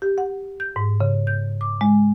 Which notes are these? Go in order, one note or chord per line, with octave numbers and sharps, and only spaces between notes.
G4
F#5
G6
G#2
C#3
G6
D6
G#3